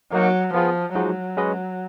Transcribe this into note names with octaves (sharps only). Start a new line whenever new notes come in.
F#3 A#3 D#4 F#4 A#4
F3 B3 F4 G#4
F3 F#3 G#3 D#4 F#4
G#3 C#4 F#4 B4 D#5